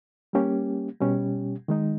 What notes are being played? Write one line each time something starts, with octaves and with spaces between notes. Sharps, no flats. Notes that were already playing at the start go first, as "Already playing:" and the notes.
G3 A#3 C#4 G4
B2 G3 C#4 G4
D#3 G#3 D#4